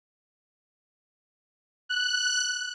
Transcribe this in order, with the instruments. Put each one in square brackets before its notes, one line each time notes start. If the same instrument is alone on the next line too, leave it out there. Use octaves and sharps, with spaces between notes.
[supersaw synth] F#6